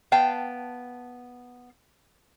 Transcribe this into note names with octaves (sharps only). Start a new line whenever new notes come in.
B3 F5 G5 A5